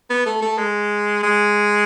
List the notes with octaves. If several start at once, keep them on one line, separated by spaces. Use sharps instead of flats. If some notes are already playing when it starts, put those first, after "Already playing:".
B3
A3
A3
G#3
G#3